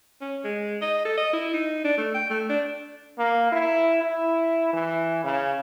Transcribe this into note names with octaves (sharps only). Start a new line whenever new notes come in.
C#4
G#3
D#5
A4
D#5
E4
D#4
D4
A3
G5
A3
D4
A#3
E4
E4
E3
C#3